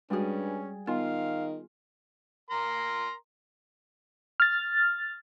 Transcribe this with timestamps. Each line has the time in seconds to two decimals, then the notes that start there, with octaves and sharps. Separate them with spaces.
0.10 G2 G3 G#3 C#4 F#4 G#4
0.87 D#3 B3 F4 F5
2.50 A#4 A#5 C6
4.40 F6 A6